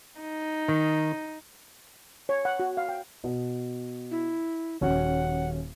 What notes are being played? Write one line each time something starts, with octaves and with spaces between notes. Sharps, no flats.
D#4
D#3
C#5
F#5
F#4
F5
G5
B2
E4
D#1 C#4 F#4 F#5